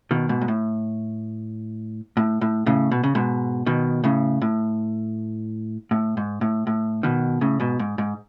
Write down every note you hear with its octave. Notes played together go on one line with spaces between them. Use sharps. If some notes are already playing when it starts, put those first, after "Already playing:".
B2 D#3
G#2 B2
G#2
A2
A2
A2
A2 C#3
B2
C#3
G#2 B2
B2 D#3
A2 C#3
A2
A2
G#2
A2
A2
B2 D#3
A2 C#3
G#2 B2
G#2
G#2